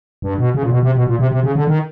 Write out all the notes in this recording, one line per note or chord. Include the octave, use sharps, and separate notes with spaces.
G2
B2
C#3
A#2
B2
C3
B2
A#2
C3
C3
C#3
D3
D#3